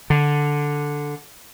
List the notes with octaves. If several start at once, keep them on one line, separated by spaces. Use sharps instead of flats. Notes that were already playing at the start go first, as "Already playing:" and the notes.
D3